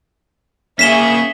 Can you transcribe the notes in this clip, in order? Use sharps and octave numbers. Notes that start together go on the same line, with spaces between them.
A#3 C#4 G#4 E5 C#6 B6 E7 G7